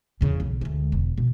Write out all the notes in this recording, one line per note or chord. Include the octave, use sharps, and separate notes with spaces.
E2 C#3
B1
D2 G#3
E1
B2